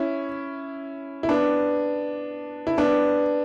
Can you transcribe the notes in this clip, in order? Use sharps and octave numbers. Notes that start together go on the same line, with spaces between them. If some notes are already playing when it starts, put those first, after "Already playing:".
Already playing: C#4 E4
E4
B3 D4
E4
B3 D4